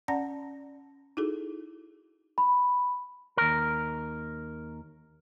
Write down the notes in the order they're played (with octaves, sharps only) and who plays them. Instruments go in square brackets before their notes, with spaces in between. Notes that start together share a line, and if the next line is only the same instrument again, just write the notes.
[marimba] C#4 D5 F#5 A5 A#5 A#6
D#4 E4 F#4 G#4 A4
[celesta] B5
[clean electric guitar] D#2 A#4